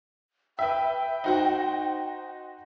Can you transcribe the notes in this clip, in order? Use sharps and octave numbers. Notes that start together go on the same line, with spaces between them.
B4 E5 G5
D#4 F#4 C5